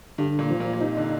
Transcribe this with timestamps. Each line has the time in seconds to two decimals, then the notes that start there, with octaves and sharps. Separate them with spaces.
0.18 G2 D3
0.39 A#2
0.50 F3
0.60 A#2
0.73 A#2
0.81 C3 D#4
0.97 D3